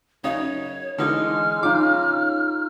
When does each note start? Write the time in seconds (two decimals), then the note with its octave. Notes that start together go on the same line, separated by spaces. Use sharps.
0.24 F#2 C#3 D#4 C#5
0.98 D3 E3 G#3 D#4 F6
1.63 C#3 D#4 F4 D6